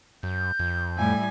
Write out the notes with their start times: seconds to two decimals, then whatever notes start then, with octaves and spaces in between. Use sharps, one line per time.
0.23 F#2 G6
0.59 F2
0.98 A2 G3 E4 G#5